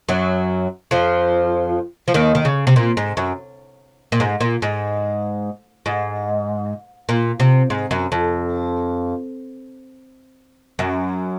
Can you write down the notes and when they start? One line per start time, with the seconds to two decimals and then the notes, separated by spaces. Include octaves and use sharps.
0.09 F#2 F#3
0.91 F2 F3
2.08 F3
2.14 D#2 D#3
2.35 D#3
2.45 C#3
2.67 C3
2.76 A#2
2.97 G#2
3.17 F#2
4.12 A#2
4.20 G#2
4.40 A#2
4.62 G#2
5.86 G#2
7.09 A#2
7.40 C3
7.70 G#2
7.91 F#2
8.12 F2
10.79 F#2